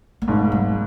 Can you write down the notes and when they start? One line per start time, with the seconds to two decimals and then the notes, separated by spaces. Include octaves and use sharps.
0.22 A#3
0.28 G#1 G#2 A3
0.52 G3